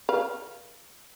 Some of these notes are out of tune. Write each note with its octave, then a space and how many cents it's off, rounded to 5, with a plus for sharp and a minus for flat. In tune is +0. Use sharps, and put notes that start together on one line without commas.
B4 -45 F5 +0